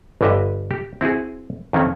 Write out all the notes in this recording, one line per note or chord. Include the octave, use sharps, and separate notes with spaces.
G1 G2 D3 G4 D#5 E5
G4
C4 E4 F#4 G#4
F2 D#3 C4 C#4